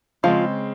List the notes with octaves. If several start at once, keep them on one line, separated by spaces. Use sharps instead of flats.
C#3 F3 G#3 C4 F4